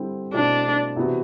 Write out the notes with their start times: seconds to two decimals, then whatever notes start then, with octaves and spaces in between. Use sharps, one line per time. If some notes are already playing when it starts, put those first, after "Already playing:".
Already playing: D3 G3 C4 E4
0.33 B2 A3 C4 D4 E4
0.96 C3 E3 B3 F#4